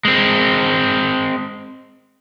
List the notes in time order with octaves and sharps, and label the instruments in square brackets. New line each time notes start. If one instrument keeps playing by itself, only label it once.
[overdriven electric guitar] G#3 C4